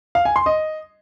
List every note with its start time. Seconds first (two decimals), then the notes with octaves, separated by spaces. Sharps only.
0.15 F5
0.25 G#5
0.36 C6
0.46 D#5